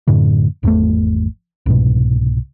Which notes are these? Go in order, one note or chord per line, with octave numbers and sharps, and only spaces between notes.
F#2 A2 D3
G#1 E2 B2 A3
C2 G#2 B2